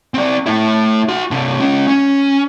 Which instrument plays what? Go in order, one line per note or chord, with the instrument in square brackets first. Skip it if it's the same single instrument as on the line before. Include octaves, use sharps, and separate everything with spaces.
[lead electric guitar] C4 D5
A3 E4
F#4 C6
C3 D4
G#3 C#4
C#4